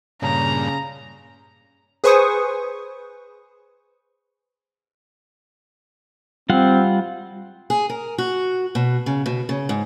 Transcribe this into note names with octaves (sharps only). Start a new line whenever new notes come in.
G2 A#2 C#3 A#5
G#4 B4 C5 G#5 C#6 D#6
G3 C4 F4 F#5
G#4
A#4
F#4
B2
C#3
B2
C#3
G#2